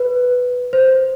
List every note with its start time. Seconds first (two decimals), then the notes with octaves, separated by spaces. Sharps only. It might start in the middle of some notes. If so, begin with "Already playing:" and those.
Already playing: B4
0.73 C5